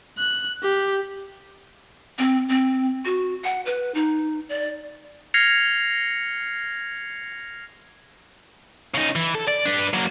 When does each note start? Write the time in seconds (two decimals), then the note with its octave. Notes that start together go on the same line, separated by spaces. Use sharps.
0.18 F#6
0.63 G4
2.19 C4
2.49 C4
3.05 F#4
3.44 F#5
3.66 B4
3.95 D#4
4.49 D5
5.34 F6 G#6 A#6 C7 C#7 F7
8.94 C#3 D#4
9.16 E3
9.35 A4
9.48 D5
9.65 D4 B4
9.94 F#3 A#3